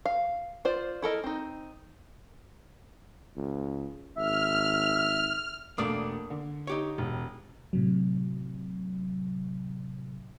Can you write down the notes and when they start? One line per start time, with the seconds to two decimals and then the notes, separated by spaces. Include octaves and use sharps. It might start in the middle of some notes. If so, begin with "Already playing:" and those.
0.06 F5
0.65 F4 C5 D5
1.02 E4 A4 A#4 D#5
1.24 C4 D#4
3.36 C#2
4.17 G#1 E5 F6
5.78 E1 A3 A#3 D4 D5 D#6
6.30 D3
6.67 D#4 G4 C#5
6.98 E1
7.73 A2 C3 F#3